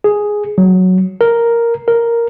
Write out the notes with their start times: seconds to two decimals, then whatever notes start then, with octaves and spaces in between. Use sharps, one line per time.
0.04 G#4
0.58 F#3
1.21 A#4
1.88 A#4